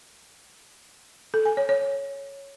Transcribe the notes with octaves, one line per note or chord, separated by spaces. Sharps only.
A4
G#5
C#5
C#5